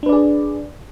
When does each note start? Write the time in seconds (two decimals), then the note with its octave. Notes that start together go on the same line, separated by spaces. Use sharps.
0.03 D4
0.06 B4
0.09 D5
0.12 G#4